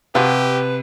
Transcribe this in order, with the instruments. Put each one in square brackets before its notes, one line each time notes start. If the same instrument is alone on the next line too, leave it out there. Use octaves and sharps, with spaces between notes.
[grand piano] C3 [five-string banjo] F3 F#4 [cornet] G4 [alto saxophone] B4